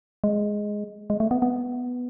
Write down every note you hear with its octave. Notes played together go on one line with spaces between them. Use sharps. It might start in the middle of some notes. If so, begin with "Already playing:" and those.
G#3
G#3
A3
B3
B3